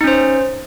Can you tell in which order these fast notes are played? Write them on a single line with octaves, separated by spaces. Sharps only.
D#4 C#4 C5